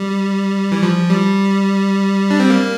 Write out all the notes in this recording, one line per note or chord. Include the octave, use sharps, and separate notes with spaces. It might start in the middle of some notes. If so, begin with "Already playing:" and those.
Already playing: G3
E3
F3
G3
D4
C4
A#3